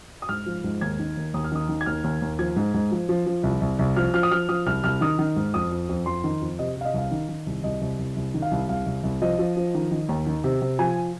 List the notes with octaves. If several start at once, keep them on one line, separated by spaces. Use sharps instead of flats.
D#6
G#2 F6
F3
G#2
D#2 G#6
D#3
D#2
D#2 D#6
F6
D#3 D#6
D#3
G#6
D#2 F6
D#2
D#2
F3 G#6
G#2
G#2
F3
F3
F3
C2
C2
C2
F3 F6
F3 F6
D#6
F3 F6
F3 D#6
C2 F6
C2 F6
D#3 D#6
D#3
G#2
F2 D#6
F2
F2
F2 C6
D#3
F2
C3 D#5
C3 F5
D#5
C2 F5
D#3
D#3
C2
C2 D#5
C2
C2
C2
D#3
F5
C2
C2 F5
C2
C2
F3 D#5
F3
F3
D#3
D#3
D#2
D#3
C3
C3
F3 G#5